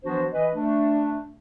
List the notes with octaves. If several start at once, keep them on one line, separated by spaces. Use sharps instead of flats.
E3 F3 B3 D4 F#4 C5
E3 B4 D#5
A3 D4